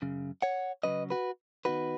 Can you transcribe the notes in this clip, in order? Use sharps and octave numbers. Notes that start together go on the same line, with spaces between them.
F#2 C#3
C#5 F#5
C#3 F#3 C#4 B4 D#5
F#4 B4
D#3 B3 D#4 F#4 B4